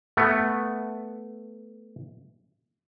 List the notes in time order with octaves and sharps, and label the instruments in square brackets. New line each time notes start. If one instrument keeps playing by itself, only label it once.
[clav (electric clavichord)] A3 B3